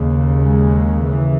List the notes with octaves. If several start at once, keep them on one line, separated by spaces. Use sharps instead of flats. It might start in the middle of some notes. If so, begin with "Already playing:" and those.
Already playing: D#2 C#3
G#3
E3